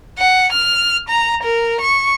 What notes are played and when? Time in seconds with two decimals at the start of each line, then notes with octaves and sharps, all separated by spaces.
0.18 F#5
0.52 F6
1.08 A#5
1.43 A#4
1.81 C#6